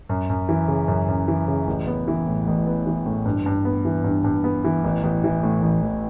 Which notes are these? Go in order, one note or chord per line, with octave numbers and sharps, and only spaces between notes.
F#2
F#2
E3
C#3
F#2
F#2
E3
C#3
A1
B3
E3
A2
A1
B3
E3
A2
G2
G2
B3
E3
G2
G2
B3
E3
A1
A1
E3
A2
A1
A1